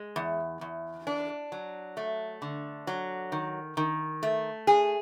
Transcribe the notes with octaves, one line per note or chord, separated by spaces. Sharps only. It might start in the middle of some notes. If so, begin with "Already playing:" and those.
Already playing: G#3
E2
E2
D4
F#3
A3
D3
F#3
D#3
D#3
A3
G#4